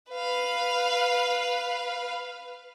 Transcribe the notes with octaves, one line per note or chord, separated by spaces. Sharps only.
B4 F5